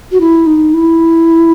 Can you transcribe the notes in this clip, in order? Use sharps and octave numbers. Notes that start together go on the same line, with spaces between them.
F#4
E4
D#4
E4